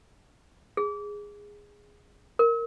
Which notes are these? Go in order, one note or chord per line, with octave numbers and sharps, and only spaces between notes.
G#4
A#4